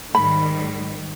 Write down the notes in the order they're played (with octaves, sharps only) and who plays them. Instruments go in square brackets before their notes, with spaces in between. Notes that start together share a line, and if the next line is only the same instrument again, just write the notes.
[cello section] G#2 D#3 G3 [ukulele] B5